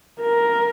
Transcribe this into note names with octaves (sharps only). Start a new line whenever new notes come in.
A#4